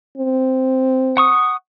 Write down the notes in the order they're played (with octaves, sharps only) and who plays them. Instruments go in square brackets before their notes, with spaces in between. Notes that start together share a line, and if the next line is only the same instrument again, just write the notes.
[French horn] C4
[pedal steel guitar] F#5 C#6 D#6